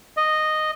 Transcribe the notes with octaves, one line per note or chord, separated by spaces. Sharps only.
D#5